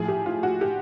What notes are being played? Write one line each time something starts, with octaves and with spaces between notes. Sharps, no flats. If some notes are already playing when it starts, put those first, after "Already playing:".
Already playing: A2 F3 G#4
G4
F4
F#4
G4